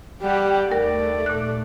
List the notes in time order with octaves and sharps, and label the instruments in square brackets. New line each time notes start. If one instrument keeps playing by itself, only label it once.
[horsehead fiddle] G3 F#5 [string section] G4
[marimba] D#2 A#4 [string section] A3 [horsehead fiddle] D5
[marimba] A#2 F#6